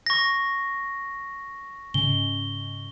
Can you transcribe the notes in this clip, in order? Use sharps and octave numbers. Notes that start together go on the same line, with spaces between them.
C#6 A#6
G#2 C#3 G7